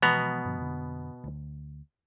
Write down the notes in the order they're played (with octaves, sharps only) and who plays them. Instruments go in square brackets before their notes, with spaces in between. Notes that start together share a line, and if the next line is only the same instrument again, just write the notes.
[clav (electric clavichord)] B2 B3 A#5 [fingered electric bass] E3 F3 G#3
[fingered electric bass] G2 D3 F3
F2 D3
D2